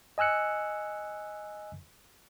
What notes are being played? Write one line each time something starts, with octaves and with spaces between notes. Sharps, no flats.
D#5 G#5 E6 F#6 C#7